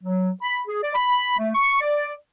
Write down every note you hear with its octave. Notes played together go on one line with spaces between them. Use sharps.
F#3
B5
G#4
D5
B5
A3
C#6
D5